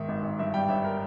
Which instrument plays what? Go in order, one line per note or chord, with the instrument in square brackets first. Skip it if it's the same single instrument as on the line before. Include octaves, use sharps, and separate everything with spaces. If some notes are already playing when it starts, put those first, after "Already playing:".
Already playing: [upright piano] G#2 D#3 E5
G#1
G#1
G2 E5
G3 G5
G1 E5
A#4